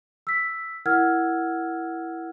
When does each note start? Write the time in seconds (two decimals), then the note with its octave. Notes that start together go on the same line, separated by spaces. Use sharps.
0.27 E6 B6
0.86 E4 A#4 F#5 E6 F6 G#6